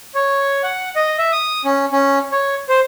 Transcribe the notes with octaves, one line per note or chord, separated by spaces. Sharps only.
C#5
F#5
D#5
E5
D#6
C#4
C#4
C#5
C5